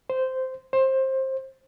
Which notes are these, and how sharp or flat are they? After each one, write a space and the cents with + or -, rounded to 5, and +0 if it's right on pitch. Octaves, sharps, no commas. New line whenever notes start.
C5 -10
C5 +20